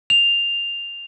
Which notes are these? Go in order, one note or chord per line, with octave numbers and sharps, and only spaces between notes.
F7